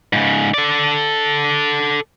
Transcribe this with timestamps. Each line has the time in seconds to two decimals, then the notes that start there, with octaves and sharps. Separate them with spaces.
0.13 G#2 C#3
0.54 A4 D5